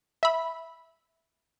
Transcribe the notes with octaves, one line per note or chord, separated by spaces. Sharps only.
E5 B5